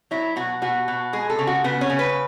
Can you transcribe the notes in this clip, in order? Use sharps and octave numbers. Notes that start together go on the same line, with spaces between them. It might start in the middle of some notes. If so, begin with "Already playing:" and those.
F#3 E4
B2 F#4
B2 F#4
B2
G#3 G#4
A4
C#3
F#4
C#3 B3
C#4
C#3
B4